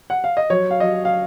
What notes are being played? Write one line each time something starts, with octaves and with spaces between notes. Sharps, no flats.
F#5
F5
D#5
F#3 C#5
F5
F#3 D#5
F5